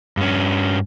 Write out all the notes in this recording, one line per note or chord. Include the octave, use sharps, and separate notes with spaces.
G2 C#4